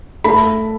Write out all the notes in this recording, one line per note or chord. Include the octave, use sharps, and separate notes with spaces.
A3 B5